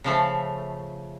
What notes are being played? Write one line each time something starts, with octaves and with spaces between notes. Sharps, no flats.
C#3 F3 A3